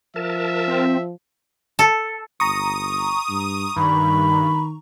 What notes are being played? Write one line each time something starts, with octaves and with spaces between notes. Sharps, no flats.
F3 A#4 E5 A5
C4
A4
G1 A#5 C#6 D#6
G2
G2 D#3 B5